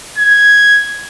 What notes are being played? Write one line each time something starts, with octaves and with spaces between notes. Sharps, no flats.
G#6